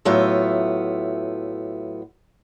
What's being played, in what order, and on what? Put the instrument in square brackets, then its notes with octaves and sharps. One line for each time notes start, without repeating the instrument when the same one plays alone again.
[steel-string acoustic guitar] A2 F#3 B3 F4 E5